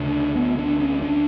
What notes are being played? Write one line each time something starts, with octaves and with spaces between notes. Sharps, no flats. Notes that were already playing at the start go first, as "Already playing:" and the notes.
Already playing: D2 C#3 D4
B3
D4
C#4
D4